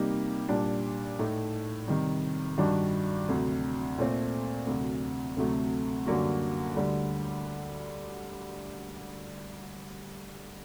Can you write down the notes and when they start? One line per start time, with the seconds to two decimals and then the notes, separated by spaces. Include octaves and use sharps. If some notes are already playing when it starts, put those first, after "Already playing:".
Already playing: C3 G3 A#3 D#4 G4
0.49 A#2 G3 D4 G4
1.19 A2 A3 D#4
1.88 C3 D#3 G3
2.58 G2 D#3 G3 D4 F#4
3.28 D2 C3 F#3
3.98 A#2 A3 C4
4.67 D2 C3 F#3
5.36 D2 C3 F#3 A3
6.06 F#2 D3 G3 A#3 F#4
6.76 D2 D3 G3